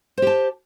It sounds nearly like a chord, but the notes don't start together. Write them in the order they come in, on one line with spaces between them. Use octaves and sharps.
C5 G4 A5